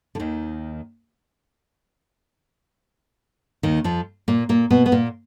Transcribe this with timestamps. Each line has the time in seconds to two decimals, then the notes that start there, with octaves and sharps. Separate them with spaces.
0.15 D3
0.20 D#2 D#3
3.63 D#2 D#3
3.84 F2 F3
4.28 A#2 A#3
4.49 A#2 A#3
4.71 B2 B3
4.86 B3
4.92 A#2 A#3